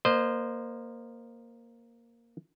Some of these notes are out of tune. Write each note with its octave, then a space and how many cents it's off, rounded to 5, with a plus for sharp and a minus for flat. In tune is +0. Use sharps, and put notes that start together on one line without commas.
A#3 +0 C5 -10 D#5 -35